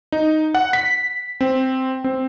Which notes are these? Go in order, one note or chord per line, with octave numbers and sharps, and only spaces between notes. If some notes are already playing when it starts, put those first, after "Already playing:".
D#4
F#5
B6
C4
C4